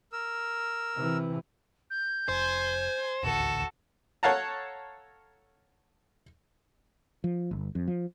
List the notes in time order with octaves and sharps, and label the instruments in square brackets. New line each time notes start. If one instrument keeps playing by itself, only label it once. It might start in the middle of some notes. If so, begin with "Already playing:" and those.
[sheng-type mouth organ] A#4 E6
[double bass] C3 E3
[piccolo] G6
[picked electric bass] F1 [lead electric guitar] C5 [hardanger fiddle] G#5
[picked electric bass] D#1 A1 D2 [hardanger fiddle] F#4 A4 [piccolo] E7
[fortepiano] A4 C#5 F5 F#5 A5 A#5
[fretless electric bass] F3
G1
F2
F3